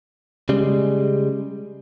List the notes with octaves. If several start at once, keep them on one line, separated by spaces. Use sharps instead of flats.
C#3 G3 G#3